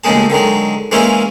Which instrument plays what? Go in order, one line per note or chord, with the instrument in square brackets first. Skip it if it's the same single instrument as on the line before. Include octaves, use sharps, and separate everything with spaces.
[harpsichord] A1 D#2 C#3 G#3 G#4 A5
D3 D#3 F#3 G#3
E3 G#3 A#3 C#4 E4 F4